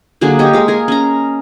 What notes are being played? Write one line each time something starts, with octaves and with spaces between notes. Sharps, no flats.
D3 F#3 A#3 G#4
G4 C#5 D#5
G#3 F5
G#4 A#4
C#4 A#5